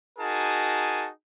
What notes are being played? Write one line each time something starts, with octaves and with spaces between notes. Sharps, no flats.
D#4 F#4 G#4 A#4 G#5 A5